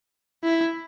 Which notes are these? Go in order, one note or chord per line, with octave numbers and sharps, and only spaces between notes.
E4